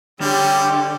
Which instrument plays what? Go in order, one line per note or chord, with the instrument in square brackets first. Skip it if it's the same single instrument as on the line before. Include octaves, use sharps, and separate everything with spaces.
[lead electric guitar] D3 [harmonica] G3 C#4 [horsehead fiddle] G4 E5